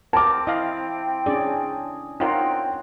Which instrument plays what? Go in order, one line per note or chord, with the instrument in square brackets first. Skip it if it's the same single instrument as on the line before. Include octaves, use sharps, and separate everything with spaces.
[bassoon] C4 [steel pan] A#4 [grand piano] A5 D6
[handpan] E4 [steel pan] D#5 F5
[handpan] C#4 D4 G#4 [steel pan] D5
[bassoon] C4 [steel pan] D#4 F4 A#4 [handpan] C#5 F#5